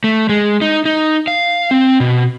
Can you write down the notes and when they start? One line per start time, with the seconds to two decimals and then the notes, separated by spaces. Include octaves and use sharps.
0.04 A3
0.29 G#3
0.61 D#4
0.86 D#4
1.28 F5
1.71 C4
2.00 B2